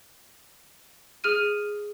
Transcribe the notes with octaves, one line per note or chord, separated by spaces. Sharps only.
G#4 F6 D#7